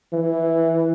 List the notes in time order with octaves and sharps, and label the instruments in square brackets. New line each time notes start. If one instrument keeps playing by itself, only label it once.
[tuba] E3